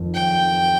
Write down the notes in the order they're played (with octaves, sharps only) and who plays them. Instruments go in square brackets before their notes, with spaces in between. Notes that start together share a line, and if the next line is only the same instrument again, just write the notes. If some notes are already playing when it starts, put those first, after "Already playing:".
Already playing: [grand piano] F2 D#3
[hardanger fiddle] G5